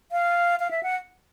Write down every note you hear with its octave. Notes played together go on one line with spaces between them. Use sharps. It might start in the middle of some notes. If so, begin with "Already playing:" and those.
F5
F5
E5
F#5